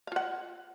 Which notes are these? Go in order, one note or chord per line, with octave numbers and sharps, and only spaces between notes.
F4 F5 F#5